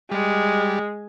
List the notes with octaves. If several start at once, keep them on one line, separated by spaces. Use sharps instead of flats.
G3 G#3